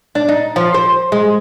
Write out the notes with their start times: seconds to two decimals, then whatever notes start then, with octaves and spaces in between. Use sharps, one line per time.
0.15 D4
0.28 D#4
0.56 F3
0.74 C5
1.12 G#3